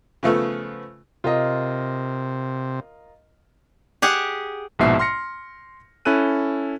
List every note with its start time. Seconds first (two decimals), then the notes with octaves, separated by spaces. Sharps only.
0.23 C#3 F3 A3 B3
1.24 C3 F4 A#4 D#5
4.02 G4 G#4 F#5
4.79 A#1 G#2 B2 E5 C7
4.99 C6 F6 A#6 C#7
6.05 C#4 E4 A4 F#6 D#7